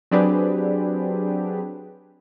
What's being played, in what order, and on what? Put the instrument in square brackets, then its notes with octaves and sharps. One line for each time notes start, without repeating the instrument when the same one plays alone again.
[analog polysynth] F#3 C4 D4 G4 G#4 B4